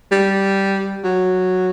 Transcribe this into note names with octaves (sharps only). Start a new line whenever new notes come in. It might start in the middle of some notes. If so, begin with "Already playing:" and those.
G3
F#3